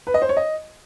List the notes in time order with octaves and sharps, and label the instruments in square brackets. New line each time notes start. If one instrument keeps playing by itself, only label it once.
[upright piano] B4
D#5
C5
C#5
D#5